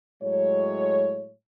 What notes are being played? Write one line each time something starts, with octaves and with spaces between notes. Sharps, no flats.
A2 F#3 G#3 C#5